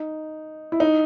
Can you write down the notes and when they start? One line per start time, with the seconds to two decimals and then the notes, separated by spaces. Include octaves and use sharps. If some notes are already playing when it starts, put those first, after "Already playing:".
Already playing: D#4
0.72 E4
0.80 D#4